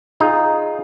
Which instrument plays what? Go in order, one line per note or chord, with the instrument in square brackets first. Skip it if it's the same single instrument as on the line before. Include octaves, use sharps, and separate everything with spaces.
[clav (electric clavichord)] D#4 [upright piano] F4 G#4